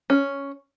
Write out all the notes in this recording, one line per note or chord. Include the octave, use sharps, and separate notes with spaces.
C#4